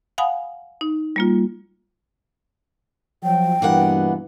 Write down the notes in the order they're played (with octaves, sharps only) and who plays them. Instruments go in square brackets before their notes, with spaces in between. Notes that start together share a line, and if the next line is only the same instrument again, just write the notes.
[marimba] F5 F#5 G#5 B5 D#6
D#4
G3 A#3 F4
[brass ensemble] F3 F#3 [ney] G5
[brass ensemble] G2 B2 E3 [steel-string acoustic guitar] A#3 B3 F#5